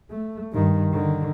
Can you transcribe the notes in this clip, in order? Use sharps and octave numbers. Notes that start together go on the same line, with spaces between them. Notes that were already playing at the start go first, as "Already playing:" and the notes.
A3
G2 D#3
D3 D#3